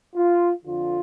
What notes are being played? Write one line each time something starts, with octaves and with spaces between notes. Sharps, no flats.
F4
F2 D3 F3 F4